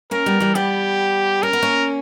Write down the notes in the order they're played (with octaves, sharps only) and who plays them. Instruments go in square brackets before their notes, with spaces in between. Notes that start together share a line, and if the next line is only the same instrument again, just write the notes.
[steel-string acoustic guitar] A#3 C#4 [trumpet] A#4
[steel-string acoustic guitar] G3 B3
E3 G3
[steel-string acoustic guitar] G3 B3 [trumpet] G4
[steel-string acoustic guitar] C#4 [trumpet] A#4
[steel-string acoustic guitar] B3
A#3 C#4